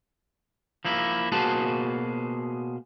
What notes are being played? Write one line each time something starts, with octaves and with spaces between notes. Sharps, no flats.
F3 A#3 E4
B2 A#3 F#4 G#4 C5 A5